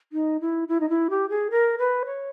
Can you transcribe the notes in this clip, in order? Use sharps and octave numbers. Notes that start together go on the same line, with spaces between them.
D#4
E4
E4
D#4
E4
G4
G#4
A#4
B4
C#5